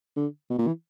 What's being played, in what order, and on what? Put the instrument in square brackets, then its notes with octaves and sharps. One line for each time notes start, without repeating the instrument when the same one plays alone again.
[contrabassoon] D3
B2
A#2
E3